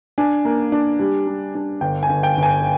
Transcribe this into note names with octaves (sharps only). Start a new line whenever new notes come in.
D4 G#5
A#3
D4
G3
G3
D4
G1 G5
G#5
G1
G5
G1
G#5